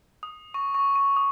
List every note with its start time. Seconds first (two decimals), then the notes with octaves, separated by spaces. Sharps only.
0.23 D#6
0.54 C#6
0.75 C#6
0.95 C#6
1.17 D#6